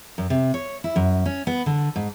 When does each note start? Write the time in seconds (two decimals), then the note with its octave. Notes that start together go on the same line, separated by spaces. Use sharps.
0.18 F#2
0.30 C3
0.54 C#5
0.84 E4
0.96 F#2
1.26 C#4
1.47 B3
1.66 D3
1.96 G#2